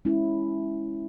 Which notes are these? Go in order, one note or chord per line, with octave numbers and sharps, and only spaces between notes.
G#3 C#4 E4